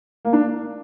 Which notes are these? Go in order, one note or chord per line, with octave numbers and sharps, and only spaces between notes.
A#3
D4